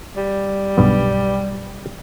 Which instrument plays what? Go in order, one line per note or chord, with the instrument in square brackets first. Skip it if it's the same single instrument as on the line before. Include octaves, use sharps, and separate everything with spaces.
[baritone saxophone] G3
[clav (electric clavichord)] B1 G2 B3